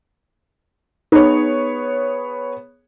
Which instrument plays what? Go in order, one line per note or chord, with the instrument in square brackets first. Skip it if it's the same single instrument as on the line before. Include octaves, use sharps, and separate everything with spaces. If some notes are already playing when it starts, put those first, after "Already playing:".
[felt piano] B3 G#4 C#5 [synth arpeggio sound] D#4